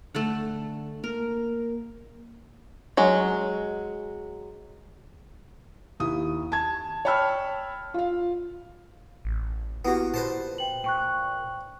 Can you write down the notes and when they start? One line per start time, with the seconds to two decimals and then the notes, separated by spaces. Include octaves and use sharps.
0.15 D3 A3 A4 F#5
1.04 A#3 A#4
2.97 F#3 G#3
6.00 D#2 E4 D#6
6.52 A5 G#6
7.05 C#5 G5 A5 B5 E6 F6
7.94 F4 F5
9.25 A1
9.85 A#3 B3 E4 F#4 G4
10.14 A#2 B4 C5 A5
10.58 G5 F#7
10.84 A#2 G5 C#6 F#6